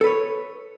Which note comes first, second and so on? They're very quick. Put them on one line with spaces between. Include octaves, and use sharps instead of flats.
A4 B4 C#5